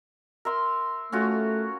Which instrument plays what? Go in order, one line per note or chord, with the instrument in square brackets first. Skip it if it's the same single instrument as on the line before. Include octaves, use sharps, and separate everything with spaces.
[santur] A#4 E5 C6
[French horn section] A3 [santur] C#4 F4 F#4